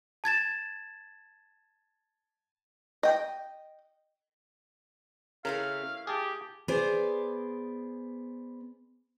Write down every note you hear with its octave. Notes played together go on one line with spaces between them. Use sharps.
A5 G#6 A6 E7
D#5 G5
C#3 A3 E4 A#4 F5
G4 G#4 A5
B3 G#4 C5 D5